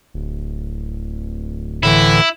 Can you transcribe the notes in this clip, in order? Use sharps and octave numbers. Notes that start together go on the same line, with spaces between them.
D1
A2 D3 E3 E4